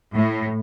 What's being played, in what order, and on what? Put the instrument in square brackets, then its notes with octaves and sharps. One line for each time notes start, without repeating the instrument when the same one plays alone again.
[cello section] A2